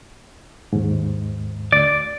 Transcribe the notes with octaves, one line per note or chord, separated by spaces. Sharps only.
D#2 G#2
D2 D5